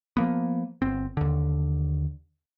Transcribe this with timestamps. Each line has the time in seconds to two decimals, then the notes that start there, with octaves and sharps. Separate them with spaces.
0.17 F3 A#3 B3
0.82 G1 C4
1.17 D#2 D3